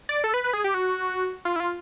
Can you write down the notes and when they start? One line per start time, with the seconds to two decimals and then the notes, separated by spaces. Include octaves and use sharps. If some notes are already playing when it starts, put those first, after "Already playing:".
0.09 D5
0.24 A4
0.34 B4
0.44 B4
0.53 G#4
0.64 G4
0.74 F#4
1.45 F4
1.56 E4
1.60 F4